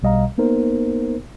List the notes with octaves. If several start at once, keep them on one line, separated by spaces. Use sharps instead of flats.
B1 B2 G3 D#5 F5 A#5
A#3 B3 D#4 A#4 C5